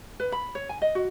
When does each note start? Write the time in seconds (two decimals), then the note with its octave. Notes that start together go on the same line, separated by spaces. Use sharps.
0.20 B4
0.32 B5
0.55 C#5
0.69 G#5
0.82 D#5
0.95 F#4